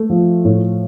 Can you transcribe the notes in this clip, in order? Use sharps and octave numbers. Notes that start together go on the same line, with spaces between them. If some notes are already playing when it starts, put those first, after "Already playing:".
Already playing: A3
F3
A2